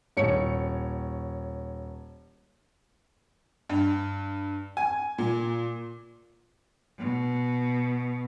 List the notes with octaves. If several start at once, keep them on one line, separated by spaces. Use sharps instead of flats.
D#1 C#5 C#7
G2
G#5
A#2
B2